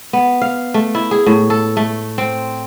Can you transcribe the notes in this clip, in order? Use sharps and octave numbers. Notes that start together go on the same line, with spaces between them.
B3
F5
A3
E4
G#4
A2
A4
A3
C4